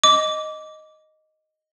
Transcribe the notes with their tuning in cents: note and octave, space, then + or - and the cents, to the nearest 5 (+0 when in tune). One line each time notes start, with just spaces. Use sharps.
D#5 +0 D6 -15